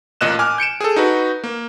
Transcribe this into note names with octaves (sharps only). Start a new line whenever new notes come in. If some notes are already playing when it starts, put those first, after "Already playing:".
A1 A#2 D#5 F#6 E7
G#5 D6 F6
G6 C#7 D7 E7
G#4 A4
D#4 F#4 B4
A#3